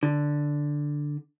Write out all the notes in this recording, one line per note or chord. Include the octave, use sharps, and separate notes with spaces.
D3